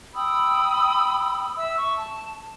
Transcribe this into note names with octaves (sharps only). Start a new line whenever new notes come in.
G5 B5 D#6 E6
E5 E6
C#6
A5